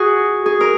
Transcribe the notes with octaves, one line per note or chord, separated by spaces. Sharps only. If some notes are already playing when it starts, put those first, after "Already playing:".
Already playing: F#4 G#4
G#4
A#4